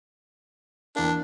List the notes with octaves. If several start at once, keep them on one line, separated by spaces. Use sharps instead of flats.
E2 A#3 D4